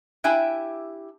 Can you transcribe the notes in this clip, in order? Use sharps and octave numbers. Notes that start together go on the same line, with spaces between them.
D4 E4 G4 E5 G5 G#5